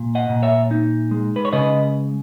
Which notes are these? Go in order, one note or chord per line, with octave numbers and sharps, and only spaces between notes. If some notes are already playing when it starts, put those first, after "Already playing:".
Already playing: A#2
D#5 F#5
A#2
C#5 E5
D#4
G#3
B4
C#5
C#3 B4 D#5